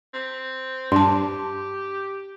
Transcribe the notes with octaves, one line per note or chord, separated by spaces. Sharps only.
C4
G2 G4 A5 C6